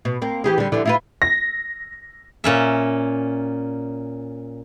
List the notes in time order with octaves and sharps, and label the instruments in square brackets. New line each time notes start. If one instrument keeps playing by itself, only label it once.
[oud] B2
A#3 C4
E3 G4 G#4
D3 G3
D3 E3 F3
E4 F4 B4
[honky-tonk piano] A#6
[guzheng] A#2 C#4 E5